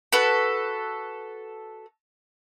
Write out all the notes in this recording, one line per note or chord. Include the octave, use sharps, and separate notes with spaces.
F#4 A4 B4